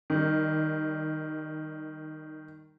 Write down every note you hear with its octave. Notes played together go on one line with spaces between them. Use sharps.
D#3 G3